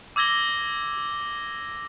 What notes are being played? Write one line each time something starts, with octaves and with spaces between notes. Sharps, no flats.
D6 E6 G#6 A#6 G7